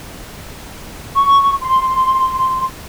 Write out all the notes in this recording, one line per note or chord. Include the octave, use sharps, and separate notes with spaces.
C#6
C6